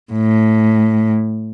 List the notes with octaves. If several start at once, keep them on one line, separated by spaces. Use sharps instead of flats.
A2